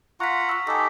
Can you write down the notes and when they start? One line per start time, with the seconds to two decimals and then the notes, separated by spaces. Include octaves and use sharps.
0.20 F4 F#5 A#5 C#6 B6
0.49 C#6 E6
0.67 D#4 G4 A4 G#5 B6